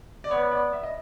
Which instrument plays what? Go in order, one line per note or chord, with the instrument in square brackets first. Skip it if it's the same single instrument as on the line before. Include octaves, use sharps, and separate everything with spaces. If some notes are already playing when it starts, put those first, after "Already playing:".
[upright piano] D5
[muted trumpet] B3 [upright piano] C#5
[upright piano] D5
E5
D#5